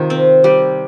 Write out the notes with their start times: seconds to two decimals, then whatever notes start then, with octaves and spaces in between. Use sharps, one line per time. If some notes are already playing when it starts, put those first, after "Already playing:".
Already playing: C3 D#3 F4
0.10 C4
0.44 G3